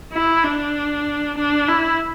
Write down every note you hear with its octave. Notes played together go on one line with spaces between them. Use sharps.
E4
D4
D4
E4